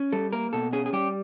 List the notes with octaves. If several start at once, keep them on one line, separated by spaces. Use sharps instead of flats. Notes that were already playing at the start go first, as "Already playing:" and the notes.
Already playing: C#4
G3 A4
A#3 A#4
B2 A4
C#4 G#4
G#4
G3 G4